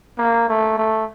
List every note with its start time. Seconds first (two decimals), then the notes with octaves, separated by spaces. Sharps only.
0.18 A#3
0.49 A3
0.78 A3